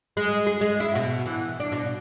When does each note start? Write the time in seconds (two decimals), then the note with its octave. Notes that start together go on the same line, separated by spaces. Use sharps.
0.17 G#3
0.47 G#4
0.61 G#3
0.80 E4
0.95 B2
1.26 E3
1.60 D4
1.72 B2